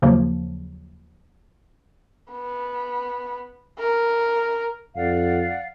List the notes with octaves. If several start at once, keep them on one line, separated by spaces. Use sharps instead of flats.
D#2 C#3 F3 F#3 A#3
B3
A#4
F2 D5 F5 F#5